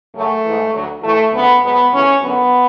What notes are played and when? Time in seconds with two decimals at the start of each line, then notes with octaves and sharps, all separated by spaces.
0.14 F#2 C#3 F#3 A3
0.44 G#2 E3
0.73 D2 D3 F#3
1.03 A2 E3 A3
1.33 D2 C#3 F#3 B3
1.62 G#2 F#3 B3
1.92 D2 C#3 E3 C#4
2.21 F#2 D3 F#3 B3